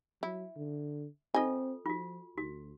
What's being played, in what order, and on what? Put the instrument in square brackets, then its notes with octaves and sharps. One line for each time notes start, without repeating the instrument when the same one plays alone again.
[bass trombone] F#3 [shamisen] E4
[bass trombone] D3
[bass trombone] C4 [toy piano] F4 A4 [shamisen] D#5 G#5
[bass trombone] F3 [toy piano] F4 F#4
[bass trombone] D2 [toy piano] F#4